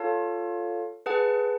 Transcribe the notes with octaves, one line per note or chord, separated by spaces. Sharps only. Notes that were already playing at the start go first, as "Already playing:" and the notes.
Already playing: F4 A4 C#5 F5 A5
G#4 B4 F#5 A5